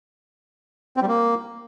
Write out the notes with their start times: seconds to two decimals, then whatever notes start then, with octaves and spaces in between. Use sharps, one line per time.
0.97 C4
1.02 G3
1.08 A#3